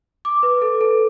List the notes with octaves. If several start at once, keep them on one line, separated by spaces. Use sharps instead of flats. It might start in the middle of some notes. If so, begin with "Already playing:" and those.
D6
B4
A4
A4